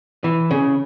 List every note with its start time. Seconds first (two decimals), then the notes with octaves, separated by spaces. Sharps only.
0.24 E3
0.51 C#3